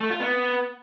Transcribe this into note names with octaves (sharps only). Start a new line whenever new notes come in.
A3
F4
B3